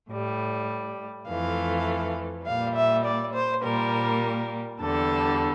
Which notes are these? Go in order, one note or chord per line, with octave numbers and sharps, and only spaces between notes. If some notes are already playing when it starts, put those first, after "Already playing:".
A2 G3
F2 E3 A3 F5
A#2 G3 F5
E5
D5
C5
A#2 G3 A#4
E2 D3 G3 A4